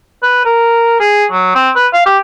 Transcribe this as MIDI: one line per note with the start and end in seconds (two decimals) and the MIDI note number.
0.23 0.42 71
0.45 0.97 70
1.00 1.25 68
1.31 1.51 54
1.55 1.69 60
1.75 1.87 71
1.93 2.04 77
2.06 2.18 67